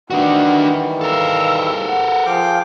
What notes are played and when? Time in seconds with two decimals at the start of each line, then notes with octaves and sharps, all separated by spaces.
0.10 D#3 E3 G3 D4 F#4 F#5
1.01 A4 A#4 F5 E6
1.87 F#5
2.26 F3 G#4 F5 G5 D6